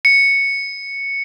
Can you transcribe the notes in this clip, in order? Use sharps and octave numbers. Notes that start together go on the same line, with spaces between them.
C#7